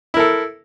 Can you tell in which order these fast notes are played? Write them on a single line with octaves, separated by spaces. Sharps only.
E4 A#4 A4